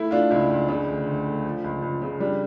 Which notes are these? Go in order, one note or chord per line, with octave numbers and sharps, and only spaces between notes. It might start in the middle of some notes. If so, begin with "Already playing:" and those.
Already playing: A3 E4
A3 D4 F4
C#2 E4
C#2
C#3 D4
D2
D2
A3
F3
C#2
C#2
C#3
G3 D4